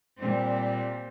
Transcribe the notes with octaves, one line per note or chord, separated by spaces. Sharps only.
A#2 G3 C4